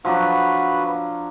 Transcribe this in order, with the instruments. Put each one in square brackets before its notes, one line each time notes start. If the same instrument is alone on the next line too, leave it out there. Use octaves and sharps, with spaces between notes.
[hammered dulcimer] F3 F#3 D4 [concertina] B3 F#4 B4